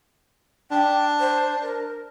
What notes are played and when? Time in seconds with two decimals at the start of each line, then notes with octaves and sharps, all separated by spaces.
0.71 D4 G5
1.20 C5
1.62 A#4